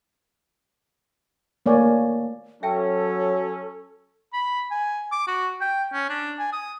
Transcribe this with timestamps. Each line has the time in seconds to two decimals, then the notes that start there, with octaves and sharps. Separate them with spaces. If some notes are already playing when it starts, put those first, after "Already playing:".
1.66 A3 A#3 C#5 D5 G#5
2.63 F#3 C#4 A4 E5 G5 A5
4.33 B5
4.71 G#5
5.12 D6
5.28 F#4
5.61 G5
5.93 C#4
6.09 D4
6.39 G#5
6.53 D#6